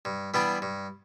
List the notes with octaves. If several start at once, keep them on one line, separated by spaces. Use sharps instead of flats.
G2
E3 G3 B3 D4
G2